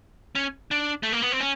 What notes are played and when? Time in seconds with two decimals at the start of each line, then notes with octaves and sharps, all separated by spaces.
0.35 C#4
0.71 D4
1.03 A3
1.13 A#3
1.22 B3
1.32 C4
1.40 C#4